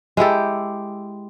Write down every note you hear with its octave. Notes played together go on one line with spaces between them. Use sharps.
G#3 E4 G4 A4